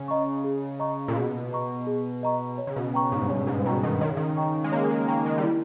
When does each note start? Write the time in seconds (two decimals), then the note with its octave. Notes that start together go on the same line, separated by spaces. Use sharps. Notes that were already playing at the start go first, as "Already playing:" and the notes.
Already playing: C#3
0.08 D#5 A#5 C#6
0.44 G#4
0.79 D#5 A#5 C#6
1.08 A#2
1.15 B2 G#4
1.51 D#5 A#5 C#6
1.87 G#4
2.23 D#5 A#5 C#6
2.58 C#5
2.67 C#3
2.76 B2
2.94 G5 A#5 C#6
3.12 G#2
3.22 G2
3.30 G#2 C#5
3.47 G#2
3.66 B2 G5 A#5 C#6
3.83 D#3
4.01 D#3 C#5
4.09 C#3
4.17 D#3
4.37 G5 A#5 C#6
4.64 G#3
4.72 A#3 C#5
4.91 G#3
5.08 A#3 G5 A#5 C#6
5.26 G#3
5.38 G3
5.44 E4